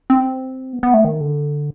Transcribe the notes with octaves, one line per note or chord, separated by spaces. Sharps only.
C4
B3
B3
A3
D#3
D3